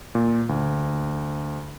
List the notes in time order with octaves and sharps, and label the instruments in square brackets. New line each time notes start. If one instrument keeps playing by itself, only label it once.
[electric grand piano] A#2
D2